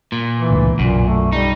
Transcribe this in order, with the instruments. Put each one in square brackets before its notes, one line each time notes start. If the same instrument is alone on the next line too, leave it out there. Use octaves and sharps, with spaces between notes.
[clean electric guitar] A#2
[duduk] E3
[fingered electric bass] C#2 A2 D3
[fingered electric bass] B1 [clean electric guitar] F#2 [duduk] A#2
[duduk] A3
[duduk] G3 [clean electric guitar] D#4